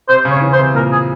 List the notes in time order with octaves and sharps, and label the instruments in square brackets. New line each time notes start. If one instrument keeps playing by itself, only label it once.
[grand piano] C3 [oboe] C5
[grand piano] C#3
[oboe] C#5
[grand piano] C#3
E3
[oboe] C5
[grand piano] C3
[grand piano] A#2 [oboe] A#4
[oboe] G#4